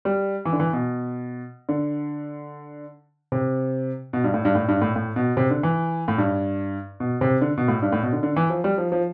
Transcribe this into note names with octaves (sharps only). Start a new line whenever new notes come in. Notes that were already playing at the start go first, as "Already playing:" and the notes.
G3
E3
D3
E3
B2
D3
C3
B2
G2
A2
G2
A2
G2
A2
A2
B2
C3
D3
E3
A2
G2
B2
C3
D3
B2
A2
G2
A2
B2
D3
D3
E3
F3
G3
F3
F3